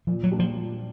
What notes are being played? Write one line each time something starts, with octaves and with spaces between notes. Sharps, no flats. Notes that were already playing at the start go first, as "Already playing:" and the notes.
A#2 F3
F#3
G3 A#3 D4
F3
A#2